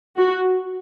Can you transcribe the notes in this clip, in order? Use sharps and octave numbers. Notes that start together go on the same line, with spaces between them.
F#4